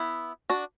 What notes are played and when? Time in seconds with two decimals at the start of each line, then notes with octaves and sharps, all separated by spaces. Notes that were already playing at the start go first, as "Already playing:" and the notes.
Already playing: B3 E4
0.50 D4 F#4